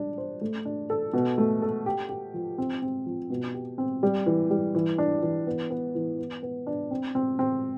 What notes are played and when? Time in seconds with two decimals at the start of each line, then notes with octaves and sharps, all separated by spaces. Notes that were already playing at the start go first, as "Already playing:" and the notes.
Already playing: G3 D4
0.18 C5
0.41 A3
0.65 D4
0.90 A4
1.13 B2
1.38 A3
1.62 A4
1.86 G4
2.09 G4
2.34 F3
2.58 C4
2.82 C4
3.06 F3
3.30 B2
3.54 G4
3.78 C4
4.03 G3
4.26 E3
4.51 G3
4.75 E3
4.98 D4
5.23 E3
5.47 B3
5.70 B3
5.95 E3
6.19 B3
6.43 B3
6.67 D4
6.91 C4
7.15 C4
7.39 C4